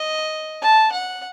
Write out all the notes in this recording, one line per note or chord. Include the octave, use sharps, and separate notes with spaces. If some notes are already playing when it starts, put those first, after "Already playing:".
Already playing: D#5
A5
F#5